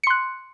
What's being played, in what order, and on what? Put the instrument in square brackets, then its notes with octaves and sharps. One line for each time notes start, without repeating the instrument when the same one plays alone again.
[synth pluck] C#7
C6
F#6